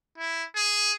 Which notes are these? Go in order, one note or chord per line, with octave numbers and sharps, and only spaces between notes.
E4
G#4